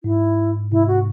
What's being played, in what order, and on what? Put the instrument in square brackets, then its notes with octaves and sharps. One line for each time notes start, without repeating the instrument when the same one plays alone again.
[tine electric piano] G#2 [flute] E4
[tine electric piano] G#2 C3 [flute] E4
[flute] F#4